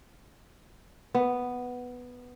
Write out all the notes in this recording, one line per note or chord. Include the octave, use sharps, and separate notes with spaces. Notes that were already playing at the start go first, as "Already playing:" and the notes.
B3